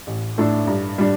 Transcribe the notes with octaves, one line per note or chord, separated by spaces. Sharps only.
A1
A2 A3 D4 A4
G2
G3 D4